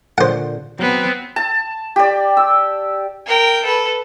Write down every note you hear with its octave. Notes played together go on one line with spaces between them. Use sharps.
A#2 D3 C5 F#5
F#3 B3 C4
A5
G4 D5
E6
A#4 G5
A4 B4